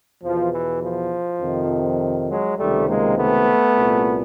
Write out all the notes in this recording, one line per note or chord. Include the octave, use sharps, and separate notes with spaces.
E2 B2 F3
E3
F3
F2 C3 D#3
F#3 G#3
C#2 C3 D#3 G3 A3
G#3 A#3
A3 B3
C2 A#2